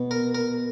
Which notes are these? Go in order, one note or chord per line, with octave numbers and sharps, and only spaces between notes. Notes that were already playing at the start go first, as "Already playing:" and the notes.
Already playing: B2
A#4
A#4